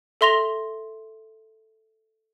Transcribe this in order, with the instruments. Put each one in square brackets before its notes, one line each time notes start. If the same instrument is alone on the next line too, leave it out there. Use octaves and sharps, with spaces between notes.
[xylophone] A4 E5 C6 A#6 F7 G7